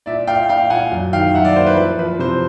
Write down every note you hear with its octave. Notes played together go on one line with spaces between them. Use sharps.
A#2 D5 E5
A#2 F5 G5
A#2 F5 G5
A#2 F#5 G#5
F#2
D#3 F5 G5
F#2 E5 F#5
D5 E5
A#3 C5
B4
F3 B4
F3 B4
C3 C5